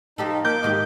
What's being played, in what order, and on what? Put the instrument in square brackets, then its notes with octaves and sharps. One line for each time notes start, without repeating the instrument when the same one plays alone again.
[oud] F3 G4 A4 [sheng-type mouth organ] D#4
[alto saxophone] A#3 [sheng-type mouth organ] D6 [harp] G6
[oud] G#2 D#3 G4 [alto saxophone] D#5